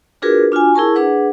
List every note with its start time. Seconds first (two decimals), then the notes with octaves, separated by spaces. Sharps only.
0.22 D4 F4 F#4 G#4 A#4 B4
0.52 D4 F4 F#4 G#5
0.74 E4 G#4 A#4 A5 C#6
0.95 D4 G#4 B4 F#5